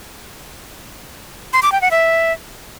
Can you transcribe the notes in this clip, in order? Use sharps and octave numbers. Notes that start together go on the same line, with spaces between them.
C6
D6
G5
F#5
E5